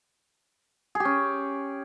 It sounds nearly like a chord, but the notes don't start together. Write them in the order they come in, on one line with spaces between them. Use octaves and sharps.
G#4 G4 C#4